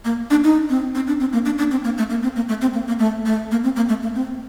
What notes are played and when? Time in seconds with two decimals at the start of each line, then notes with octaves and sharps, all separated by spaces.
0.05 A#3
0.31 D4
0.44 D#4
0.69 C4
0.95 C4
1.07 D4
1.20 C4
1.33 A#3
1.45 D4
1.58 D4
1.71 C4
1.84 A#3
1.98 A3
2.10 A#3
2.23 C4
2.36 A#3
2.49 A3
2.62 C4
2.74 A#3
2.87 A#3
2.99 A3
3.26 A3
3.51 A#3
3.64 C4
3.76 A#3
3.89 A3
4.03 A#3
4.15 C4